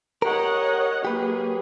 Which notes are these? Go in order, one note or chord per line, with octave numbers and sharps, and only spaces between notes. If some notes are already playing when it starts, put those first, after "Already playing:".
G4 A#4 C#5 D#5 F#5
F#3 A#3 G4 G#4 B4